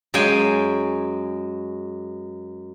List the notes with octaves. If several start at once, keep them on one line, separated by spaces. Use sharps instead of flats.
F#2 G#3 F5 G5 G#5